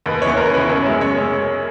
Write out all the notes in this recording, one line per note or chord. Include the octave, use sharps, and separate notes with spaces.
D#2 B4
C#3 E3 B3 C#5
D#2 A#4
C#3 E3 B3 B4
F#2 C#5
C#3 G#3 C#4 E5
F#2 C#5
C#3 G#3 C#4